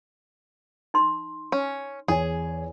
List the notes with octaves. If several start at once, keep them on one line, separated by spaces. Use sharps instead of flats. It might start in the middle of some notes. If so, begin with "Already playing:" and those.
D#4 C6
C#4
E2 G#4 C#5 G#5